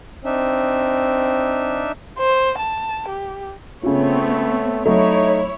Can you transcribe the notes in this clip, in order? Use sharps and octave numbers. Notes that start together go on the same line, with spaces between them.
C4 D4 D#4 E5
C5
A5
G4
C#3 A3 B3 C4 F4 C#5
F#3 A3 D#4 E4 C#5